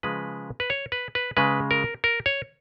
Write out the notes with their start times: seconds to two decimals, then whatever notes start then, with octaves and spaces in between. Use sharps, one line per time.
0.03 C#3 F3 G#3 B4
0.60 B4
0.70 C#5
0.92 B4
1.15 B4
1.37 C#3 G#3 B4
1.71 A#4
2.04 A#4
2.26 C#5